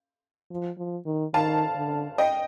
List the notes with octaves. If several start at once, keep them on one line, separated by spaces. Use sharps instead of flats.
F3
F3
D#3
D#3 F5 A5
D3
D#5 G5